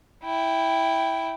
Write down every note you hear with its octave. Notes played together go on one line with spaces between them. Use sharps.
E4 G5